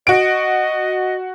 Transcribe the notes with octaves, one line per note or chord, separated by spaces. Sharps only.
F#4 D#5 D7